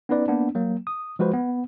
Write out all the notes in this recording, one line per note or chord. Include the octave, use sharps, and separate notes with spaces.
B3 C#4 D#4 B4 D5
A#3 B3 D4
F#3 A#3
D#6
F3 G#3 F#4 B4 C5
B3